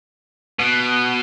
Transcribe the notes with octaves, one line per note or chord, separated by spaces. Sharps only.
B2